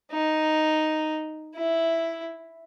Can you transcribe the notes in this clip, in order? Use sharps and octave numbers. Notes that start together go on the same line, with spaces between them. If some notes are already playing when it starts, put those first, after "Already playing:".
D#4
E4